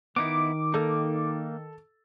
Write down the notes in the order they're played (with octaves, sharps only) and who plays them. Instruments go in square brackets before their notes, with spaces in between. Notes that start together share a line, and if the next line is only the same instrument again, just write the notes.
[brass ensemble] D#3 [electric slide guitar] B3 D#4 E4 [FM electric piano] D6
[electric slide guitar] A#3 D#4 [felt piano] A4